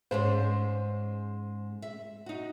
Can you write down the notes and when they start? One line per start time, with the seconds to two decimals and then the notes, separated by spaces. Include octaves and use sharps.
0.11 G#2 G#3 C#4 C5
1.82 E5
2.26 D#4 F#4